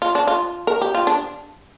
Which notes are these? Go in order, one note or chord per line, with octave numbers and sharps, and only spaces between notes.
F4
D4
F4
A#4
G4
F4
D4